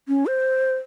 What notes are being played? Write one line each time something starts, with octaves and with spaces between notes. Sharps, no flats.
C#4
C5